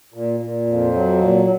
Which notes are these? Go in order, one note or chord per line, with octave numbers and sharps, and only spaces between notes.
A#2
A#2
F2
F#3
A#2